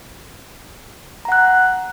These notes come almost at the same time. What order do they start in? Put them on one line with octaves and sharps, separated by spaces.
A#5 F#5 F#6